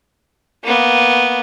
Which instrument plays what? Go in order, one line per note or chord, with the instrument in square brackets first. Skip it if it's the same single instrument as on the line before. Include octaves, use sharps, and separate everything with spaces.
[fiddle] A#3 B3